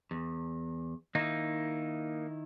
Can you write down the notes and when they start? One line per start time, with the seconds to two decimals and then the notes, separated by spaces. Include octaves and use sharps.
0.11 E2
1.15 D#3 A#3 D#4 E4